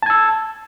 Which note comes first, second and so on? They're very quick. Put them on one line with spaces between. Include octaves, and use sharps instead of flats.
A5 G#6 E6